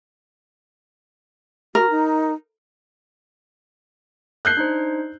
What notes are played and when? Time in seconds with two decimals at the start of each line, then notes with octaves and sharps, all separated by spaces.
1.75 F#4 A#4
1.90 D#4
4.45 F#6 G6 C7
4.57 D4 D#4 C5